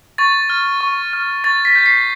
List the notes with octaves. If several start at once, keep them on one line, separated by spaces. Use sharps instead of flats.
C#6 A6
F6
C#6
F6
C#6 A6
B6
G6 B6
C7